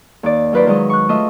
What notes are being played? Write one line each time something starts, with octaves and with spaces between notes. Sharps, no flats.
D#2 D5
F#3 F4 B4 C5 D5
D#3 F#3 G#3 B4 D#5
C#6 F#6
A3 F4 D#5 E5